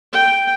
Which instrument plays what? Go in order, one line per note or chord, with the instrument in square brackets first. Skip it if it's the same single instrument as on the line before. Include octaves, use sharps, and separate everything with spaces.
[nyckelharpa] G5